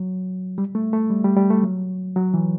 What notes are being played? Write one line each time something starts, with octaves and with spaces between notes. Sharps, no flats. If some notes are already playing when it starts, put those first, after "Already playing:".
Already playing: F#3
G3
A3
A3
G3
G3
G3
A3
F#3
F#3
E3